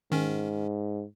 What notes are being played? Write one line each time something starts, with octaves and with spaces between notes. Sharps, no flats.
G#2 D#3 C#4